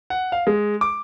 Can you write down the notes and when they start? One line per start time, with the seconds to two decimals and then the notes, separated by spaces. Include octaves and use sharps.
0.10 F#5
0.32 F5
0.47 G#3
0.81 D6